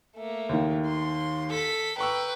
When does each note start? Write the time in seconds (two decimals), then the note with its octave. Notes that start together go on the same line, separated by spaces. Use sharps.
0.16 A3 A#3
0.49 D#2 D#3
0.86 C6
1.50 A4 B6
1.98 B4 G5 A#5 C#6 E6